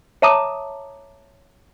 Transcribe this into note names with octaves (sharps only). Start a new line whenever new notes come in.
C#5 E5 A5 A#5 D6 D#6